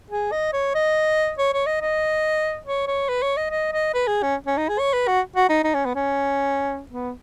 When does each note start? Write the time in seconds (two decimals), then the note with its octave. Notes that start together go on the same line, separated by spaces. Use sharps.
0.10 G#4
0.32 D#5
0.53 C#5
0.75 D#5
1.38 C#5
1.53 C#5
1.66 D#5
1.81 D#5
2.66 C#5
2.87 C#5
3.09 B4
3.22 C#5
3.37 D#5
3.51 D#5
3.73 D#5
3.94 B4
4.07 G#4
4.23 C#4
4.47 C#4
4.57 D#4
4.69 G#4
4.79 C#5
4.93 B4
5.08 F#4
5.36 F#4
5.49 D#4
5.64 D#4
5.74 C#4
5.85 B3
5.95 C#4
6.92 B3